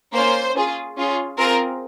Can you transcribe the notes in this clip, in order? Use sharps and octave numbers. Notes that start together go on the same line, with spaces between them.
A#3 C#4 F4 C5
C#4 F4 G#4
C#4 F4 G#4
C4 F4 G#4 A#4